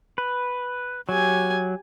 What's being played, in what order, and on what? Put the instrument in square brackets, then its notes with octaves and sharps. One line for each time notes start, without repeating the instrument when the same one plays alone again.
[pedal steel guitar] B4
[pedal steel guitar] F#3 [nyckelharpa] G4 G#5